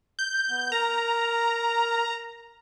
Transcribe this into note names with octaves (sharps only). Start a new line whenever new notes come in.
G6
B3
A#4 A#5